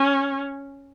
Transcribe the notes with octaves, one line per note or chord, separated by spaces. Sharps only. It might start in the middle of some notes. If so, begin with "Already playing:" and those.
Already playing: C#4